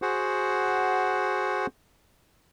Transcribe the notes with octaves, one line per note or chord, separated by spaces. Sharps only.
F#4 G#4 C5 F#5